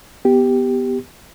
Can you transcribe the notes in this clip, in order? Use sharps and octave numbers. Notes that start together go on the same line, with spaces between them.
B3 G4